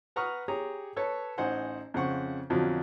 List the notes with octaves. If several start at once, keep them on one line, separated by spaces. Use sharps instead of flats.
B4 F#5 A#5 C#6 D#6 F6
G4 G#4 C#5 A#5
A4 B4 C#5 A5
A1 D#4 C5 F#5 G#5
F2 C#3 C5 F#5 C#6
F2 B2 D3 F3 F#3